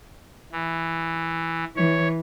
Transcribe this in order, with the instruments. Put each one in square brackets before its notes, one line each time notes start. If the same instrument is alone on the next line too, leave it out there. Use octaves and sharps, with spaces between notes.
[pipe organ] E3
[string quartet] E3 [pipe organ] C#5